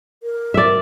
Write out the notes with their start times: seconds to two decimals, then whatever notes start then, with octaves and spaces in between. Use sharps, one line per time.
0.23 A#4
0.54 D5 E5